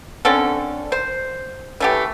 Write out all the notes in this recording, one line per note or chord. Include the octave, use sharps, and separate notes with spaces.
D3 C4 C#4 A4
C5
E3 A3 G4